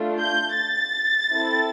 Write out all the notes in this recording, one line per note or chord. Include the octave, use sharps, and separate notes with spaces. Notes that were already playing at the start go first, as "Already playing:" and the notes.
Already playing: A3 D4 F4
G6
A6
C4 E4 A4